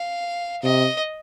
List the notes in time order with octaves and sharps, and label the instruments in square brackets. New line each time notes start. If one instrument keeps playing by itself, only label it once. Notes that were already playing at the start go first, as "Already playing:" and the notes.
Already playing: [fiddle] F5
[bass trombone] C3 [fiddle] D#5